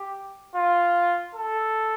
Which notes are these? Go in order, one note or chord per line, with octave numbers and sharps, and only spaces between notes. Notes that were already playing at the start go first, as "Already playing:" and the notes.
Already playing: G4
F4
A4